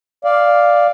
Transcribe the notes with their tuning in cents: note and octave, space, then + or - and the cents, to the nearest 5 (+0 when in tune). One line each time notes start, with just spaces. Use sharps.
D5 +0 F5 +0